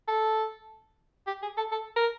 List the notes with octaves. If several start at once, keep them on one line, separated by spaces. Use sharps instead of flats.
A4
G4
G#4
A4
A4
A#4